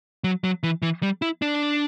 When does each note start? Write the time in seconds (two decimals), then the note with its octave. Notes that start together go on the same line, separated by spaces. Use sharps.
0.24 F#3
0.44 F#3
0.63 E3
0.82 E3
1.03 G3
1.22 E4
1.42 D4